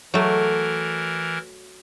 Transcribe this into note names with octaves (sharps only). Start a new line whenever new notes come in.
E3 F#3 A3 A#4